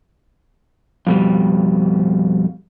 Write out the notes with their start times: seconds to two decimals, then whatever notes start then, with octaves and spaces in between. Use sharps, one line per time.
1.07 F2 B2 G3